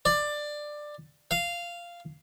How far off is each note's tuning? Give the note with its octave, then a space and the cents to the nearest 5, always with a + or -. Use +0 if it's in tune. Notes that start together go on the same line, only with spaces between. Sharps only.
D5 +15
F5 -10